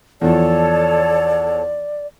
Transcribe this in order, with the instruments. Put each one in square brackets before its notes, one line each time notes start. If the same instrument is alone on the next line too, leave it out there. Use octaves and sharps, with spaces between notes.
[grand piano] E2 F3 [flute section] A4 C#5 A5 [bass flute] D5